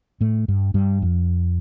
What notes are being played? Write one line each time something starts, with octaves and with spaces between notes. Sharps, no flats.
A2 A3
G2 G3
G2 G3
F2 F3